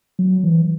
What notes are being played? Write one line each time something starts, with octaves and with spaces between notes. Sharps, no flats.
F#3
E3